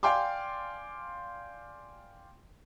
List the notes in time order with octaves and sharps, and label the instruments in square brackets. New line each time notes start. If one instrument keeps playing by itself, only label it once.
[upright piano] D5 F5 G5 G#5 C6 D6